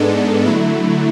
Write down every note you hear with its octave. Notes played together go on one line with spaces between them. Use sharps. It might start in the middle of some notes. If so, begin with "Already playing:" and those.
Already playing: G#2 G#3 B3 D4 A4
D3 F#3 A3 E4